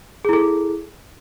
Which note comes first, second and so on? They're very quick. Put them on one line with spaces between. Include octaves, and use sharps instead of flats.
G#4 E4 A4